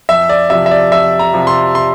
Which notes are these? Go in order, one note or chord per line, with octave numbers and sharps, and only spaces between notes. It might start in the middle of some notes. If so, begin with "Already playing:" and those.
F2 E5
D5
C3 F3 E5
E5
D5
F2 E5
A#5
C3 F3
C6
C6